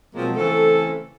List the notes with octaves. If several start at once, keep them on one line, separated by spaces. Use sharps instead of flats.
B2 F3 F#3 G#3 A#3 C4
C#3 E3 A3 C4 A4